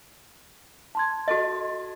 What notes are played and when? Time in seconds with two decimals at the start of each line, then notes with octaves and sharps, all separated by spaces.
0.95 A5 C6 G#6
1.28 F#4 A4 D#5